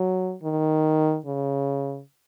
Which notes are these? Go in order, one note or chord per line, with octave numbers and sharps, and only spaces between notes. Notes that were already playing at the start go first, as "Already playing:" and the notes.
Already playing: F#3
D#3
C#3